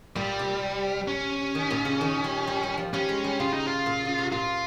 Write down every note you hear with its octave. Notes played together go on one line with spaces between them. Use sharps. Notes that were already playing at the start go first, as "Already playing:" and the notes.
A#2 G3
C3
C#4
D#3
A#2
C#3
D#3
G3
G3
G3
F3
G3 C#4
G#3
G3
C#3 F4
D#4
F4
A#2
C#3
C3
A#2 F4